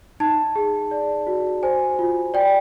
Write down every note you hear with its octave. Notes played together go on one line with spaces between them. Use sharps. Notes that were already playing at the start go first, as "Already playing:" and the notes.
D#4 A5
G#4
D5
F#4
C5 G#5
F4
D5 G5